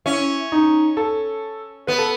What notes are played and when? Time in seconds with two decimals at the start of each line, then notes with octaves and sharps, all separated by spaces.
0.06 C#4 E4
0.52 D#4
0.97 A4
1.87 B3 B4
1.98 A4